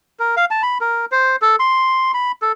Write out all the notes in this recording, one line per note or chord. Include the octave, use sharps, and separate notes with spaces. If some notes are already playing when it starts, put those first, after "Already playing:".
A#4
F5
A5
B5
A#4
C5
A4
C6
B5
A4